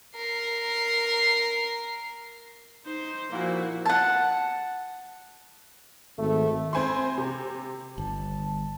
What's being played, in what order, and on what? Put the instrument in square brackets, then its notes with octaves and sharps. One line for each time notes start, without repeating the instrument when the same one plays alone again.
[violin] A#4 C7
[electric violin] D#4 C5
[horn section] A#2 A#3 [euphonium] F3 [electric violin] E4 F#4
[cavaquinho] F#5 A5
[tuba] G#1 [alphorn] A3
[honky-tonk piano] C4 C5 G#5 B5 C6
C3
[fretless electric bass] G1 [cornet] A5